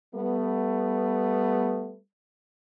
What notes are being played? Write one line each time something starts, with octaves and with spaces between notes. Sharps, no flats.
G3 A3 B3